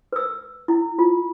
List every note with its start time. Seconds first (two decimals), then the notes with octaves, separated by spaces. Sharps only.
0.13 B4 E6
0.68 E4
0.99 F4